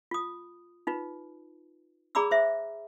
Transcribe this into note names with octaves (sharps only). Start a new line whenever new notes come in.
F4 D#6
D#4 F4 B4
G#4 D5 A#5 B5 D6 E6
C5 E5